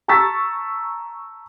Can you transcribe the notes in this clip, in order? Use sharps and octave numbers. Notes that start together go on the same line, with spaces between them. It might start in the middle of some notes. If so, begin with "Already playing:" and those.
A5 A#5 C#6 E6 A6 B6